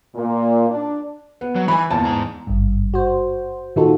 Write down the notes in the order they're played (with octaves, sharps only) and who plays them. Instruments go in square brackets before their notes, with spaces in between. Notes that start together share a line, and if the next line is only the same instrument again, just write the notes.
[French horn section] A#2
D4
[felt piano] B3
[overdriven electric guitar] F#3
[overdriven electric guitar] E3 [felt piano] G#5 B5
[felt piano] E2 A5 [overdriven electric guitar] A#2
[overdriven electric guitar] G#2 A#5
[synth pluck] G#1 G2
F#4 C5
A#2 D#3 D#4 F4 F#4 A4